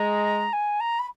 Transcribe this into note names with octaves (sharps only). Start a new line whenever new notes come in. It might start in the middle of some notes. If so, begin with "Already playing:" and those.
Already playing: G#3 A#5
G#5
A#5
B5